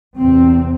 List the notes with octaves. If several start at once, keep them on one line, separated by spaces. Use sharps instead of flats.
E2 C3 C4